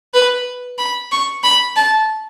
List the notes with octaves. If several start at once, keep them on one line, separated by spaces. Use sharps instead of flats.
B4
B5
C#6
B5
A5